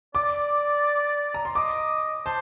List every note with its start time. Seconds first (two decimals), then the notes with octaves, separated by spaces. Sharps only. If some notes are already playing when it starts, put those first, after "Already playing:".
0.15 D5 D6
1.34 A#5
1.45 C6
1.55 D#5 D6
2.26 C5 A5